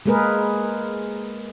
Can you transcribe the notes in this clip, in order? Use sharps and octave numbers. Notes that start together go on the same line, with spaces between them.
G#3 A#3 G#4 A#4 B4